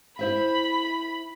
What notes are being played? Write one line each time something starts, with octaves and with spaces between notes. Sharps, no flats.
E4 C5 E5 B5